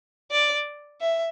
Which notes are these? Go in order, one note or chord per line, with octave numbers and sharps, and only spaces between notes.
D5
E5